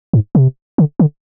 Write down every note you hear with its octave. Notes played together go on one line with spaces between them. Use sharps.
G#2
C3
D3
D3